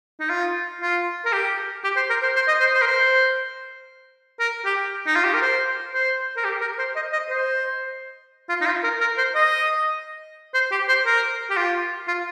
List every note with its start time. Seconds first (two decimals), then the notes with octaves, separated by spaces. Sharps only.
0.20 D#4
0.30 F4
0.81 F4
1.25 A#4
1.33 G4
1.84 G4
1.97 C5
2.10 A#4
2.23 C5
2.36 C5
2.48 D#5
2.60 C5
2.74 C5
2.82 A#4
2.86 C5
4.40 A#4
4.65 G4
5.07 D#4
5.16 F4
5.25 G4
5.34 A#4
5.42 C5
5.94 C5
6.37 A#4
6.44 G4
6.61 A#4
6.79 C5
6.96 D#5
7.13 D#5
7.29 C5
8.49 F4
8.61 D#4
8.66 F4
8.84 A#4
9.01 A#4
9.18 C5
9.35 D#5
10.54 C5
10.71 G4
10.89 C5
11.06 A#4
11.50 G4
11.57 F4
12.08 F4